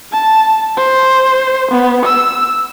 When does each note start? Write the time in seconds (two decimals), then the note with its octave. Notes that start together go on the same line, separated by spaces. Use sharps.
0.12 A5
0.77 C5
1.71 B3
2.05 E6